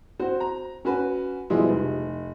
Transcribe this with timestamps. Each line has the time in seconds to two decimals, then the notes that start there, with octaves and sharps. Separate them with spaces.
0.19 C4 F#4 C5
0.40 A#5
0.85 C#4 F#4 B4
1.50 B2 F3 G3 G#3 B3 E4
1.69 F1